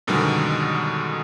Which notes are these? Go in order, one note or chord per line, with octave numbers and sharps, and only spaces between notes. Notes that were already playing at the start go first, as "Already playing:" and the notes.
F#2 B2 D3 D#3 G3 G#3